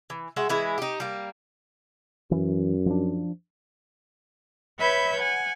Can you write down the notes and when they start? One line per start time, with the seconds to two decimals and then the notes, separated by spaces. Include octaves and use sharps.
0.10 E3
0.36 G#3 F#4 E5
0.49 E3 G#3 E4
0.78 D#4 G4
1.00 G3 A#3
2.31 F#2 E3
2.86 F3 D4
4.78 B4 C#5 E5 B5 G6 G#6
5.19 F#5 G#5